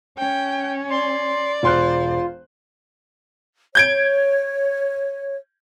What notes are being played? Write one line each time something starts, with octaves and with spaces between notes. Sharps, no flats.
C#4 G5
D5 C6
E1 F4 C5 C6 F#6
C#5 G6 G#6 D7